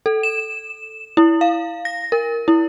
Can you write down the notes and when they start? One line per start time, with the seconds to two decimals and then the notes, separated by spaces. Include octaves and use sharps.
0.06 A4
0.23 E7
1.17 E4
1.41 F5
1.85 A#6
2.12 A#4
2.48 E4